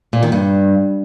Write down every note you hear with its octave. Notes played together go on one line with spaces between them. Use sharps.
A#2
D#3
G2